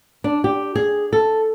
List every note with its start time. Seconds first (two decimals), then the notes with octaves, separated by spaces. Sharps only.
0.24 D4
0.44 G4
0.76 G#4
1.13 A4